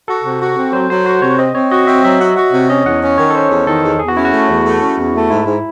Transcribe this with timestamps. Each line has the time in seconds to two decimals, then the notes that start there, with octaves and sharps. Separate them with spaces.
0.08 F#4 A4
0.24 C3
0.40 F#4
0.57 C4
0.73 F#3 C5
0.90 F#3 C5
1.06 F#4 C5
1.22 C3 C#5
1.38 C4 D#5
1.55 C4 C#5
1.71 F#4 D#5
1.87 C4 E5
2.04 F#3 E5
2.20 F#4
2.37 F#4
2.53 C3
2.69 C#4 D#5
2.86 E2 F#5
3.02 C#4
3.18 D#3 C#5
3.30 A4
3.34 C#4 C5
3.50 E2
3.67 D#3 A4
3.83 E2
3.99 E2 G#4
4.08 F#4
4.16 C#4 E4
4.25 F#4
4.32 A3
4.49 E2
4.65 A3
4.82 C#4
4.98 E2
5.14 A3
5.30 G#2 E4
5.46 G#2